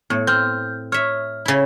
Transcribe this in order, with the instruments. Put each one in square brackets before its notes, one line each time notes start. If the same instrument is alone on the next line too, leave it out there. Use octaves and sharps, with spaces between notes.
[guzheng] A2 [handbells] B3
[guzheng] C4 [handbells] F6 G6
[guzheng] C#5 E5 [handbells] F6
[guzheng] C#3 E4